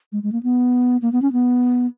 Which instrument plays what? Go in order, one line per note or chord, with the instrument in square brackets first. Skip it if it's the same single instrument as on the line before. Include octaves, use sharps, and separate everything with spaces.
[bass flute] G#3
G#3
A#3
B3
A#3
B3
C#4
B3